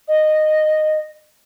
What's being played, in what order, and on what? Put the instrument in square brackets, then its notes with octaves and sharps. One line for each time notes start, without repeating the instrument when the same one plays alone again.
[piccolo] D#5